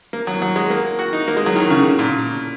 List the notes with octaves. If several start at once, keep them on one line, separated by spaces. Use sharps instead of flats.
A#3
F#3
F#3
G#3
A#3
F#4
D#4
A#3
G#3
F#3
D#3
C#3
C#3
A#2